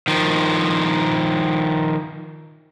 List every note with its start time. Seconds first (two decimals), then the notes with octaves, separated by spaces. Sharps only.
0.08 D#3 F3